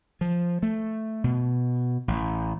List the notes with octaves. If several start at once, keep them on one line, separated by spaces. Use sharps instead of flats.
F3
A3
B2
A1